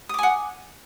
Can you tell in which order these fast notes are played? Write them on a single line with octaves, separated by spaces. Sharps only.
D#6 D6 G#5 F#5